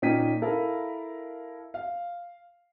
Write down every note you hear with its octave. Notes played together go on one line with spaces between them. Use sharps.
A#2 C#4 D#4 G5 B6 D#7
E4 A4 A#4 F5
F5